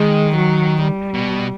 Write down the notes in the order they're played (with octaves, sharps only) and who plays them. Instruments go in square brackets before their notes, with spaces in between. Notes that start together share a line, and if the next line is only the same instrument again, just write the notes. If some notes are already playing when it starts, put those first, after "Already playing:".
Already playing: [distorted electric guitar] D#3 [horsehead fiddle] G#3
[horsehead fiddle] F#3
G3
[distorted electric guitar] B2